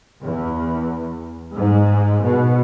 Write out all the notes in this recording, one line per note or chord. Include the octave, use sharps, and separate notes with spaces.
E2
G#2
B2